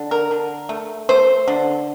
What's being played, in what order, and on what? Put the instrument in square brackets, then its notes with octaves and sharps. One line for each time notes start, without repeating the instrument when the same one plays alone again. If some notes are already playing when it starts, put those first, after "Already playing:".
Already playing: [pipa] D3
A#4
D3
A3
A3 C5
D3